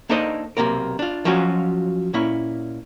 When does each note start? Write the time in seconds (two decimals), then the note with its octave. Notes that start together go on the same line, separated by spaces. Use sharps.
0.09 A#3 D4 D#4 A4 C5 D#5
0.57 B1 F#2 C3 A#3 A#4
0.99 D4 F4
1.25 F3 F#3 C#4 F4 F#4
2.14 A#2 A#3 C#4 E4